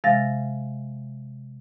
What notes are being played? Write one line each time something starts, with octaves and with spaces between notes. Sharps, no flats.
C3 E3 G#3 F5 A6 A#6